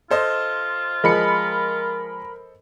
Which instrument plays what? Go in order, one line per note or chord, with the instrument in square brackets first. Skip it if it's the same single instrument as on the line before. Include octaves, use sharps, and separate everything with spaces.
[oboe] F4 [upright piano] A4 C5 D#5
[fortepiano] F3 G#3 [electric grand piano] A#4 B5 C#7